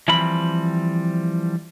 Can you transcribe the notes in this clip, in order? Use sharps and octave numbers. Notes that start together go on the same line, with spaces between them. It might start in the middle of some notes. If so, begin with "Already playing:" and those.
E3 F3 G3 C4 B5